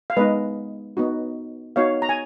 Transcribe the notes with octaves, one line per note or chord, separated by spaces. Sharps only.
F5
G#3 B3 D#4 B4 D#5
B3 D#4 F#4
B3 D#4 F#4 C#5 F5
A#5
G#5